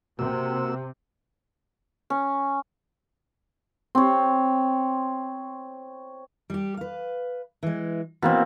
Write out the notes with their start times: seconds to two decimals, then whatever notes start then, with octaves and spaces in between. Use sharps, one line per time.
0.19 C3 A#3 F#4 E6
2.10 C#4
3.95 C4 C#5
6.50 G3 G4
6.77 B4 F5
7.63 E3 G#3
8.22 B2 E3 A#3 C4